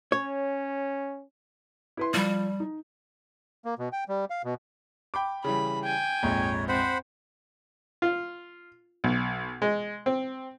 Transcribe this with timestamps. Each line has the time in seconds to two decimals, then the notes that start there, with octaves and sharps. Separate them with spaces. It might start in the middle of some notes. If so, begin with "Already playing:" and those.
0.12 C#4 C#5
1.97 E4 B4 C6
2.14 F3 G3
2.60 D#4
3.65 A#3
3.79 B2
3.93 G5
4.09 G3
4.30 F5
4.44 B2
5.14 G5 B5 D6
5.44 C#3 E3 G3 B5
5.84 G5 G#5
6.23 A#1 F2 G#2 C#5
6.69 C4 C5 F#5 B5
8.02 F4
9.04 B1
9.62 G#3
10.06 C4